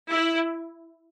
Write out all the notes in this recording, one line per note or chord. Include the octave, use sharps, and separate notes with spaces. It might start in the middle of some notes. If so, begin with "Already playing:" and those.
E4